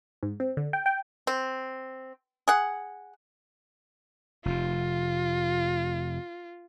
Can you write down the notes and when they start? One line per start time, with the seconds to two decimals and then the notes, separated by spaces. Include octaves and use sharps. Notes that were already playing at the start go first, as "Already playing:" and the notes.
0.23 G#2
0.40 C4
0.57 D3
0.73 G5
0.86 G5
1.27 C4
2.48 G#4 F#5
4.45 F1 C3 F4